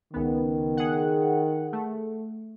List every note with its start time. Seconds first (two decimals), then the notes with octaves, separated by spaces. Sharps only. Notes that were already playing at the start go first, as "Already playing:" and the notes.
0.13 C#2 D#3 B3
0.77 G#4 F#5
1.73 A3